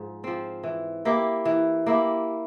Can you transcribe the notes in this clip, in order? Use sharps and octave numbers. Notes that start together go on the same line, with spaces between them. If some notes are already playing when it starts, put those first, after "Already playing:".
Already playing: G#2 F3
F3 C4
E3
A#3 E4 G4
E3
A#3 E4 G4